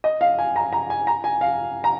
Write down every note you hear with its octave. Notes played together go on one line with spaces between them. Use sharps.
D#5
F5
G#5
A#5
A#5
G#5
A#5
G#5
F5
A#5